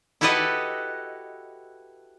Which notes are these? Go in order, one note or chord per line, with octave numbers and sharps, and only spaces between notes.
E4 F#4 G4 A4 B4 D#5